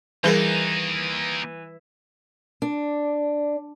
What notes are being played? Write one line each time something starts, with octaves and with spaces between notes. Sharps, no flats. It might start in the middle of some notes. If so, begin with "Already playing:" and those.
E3 G3 A#3 D#4 G#4 A#4
D4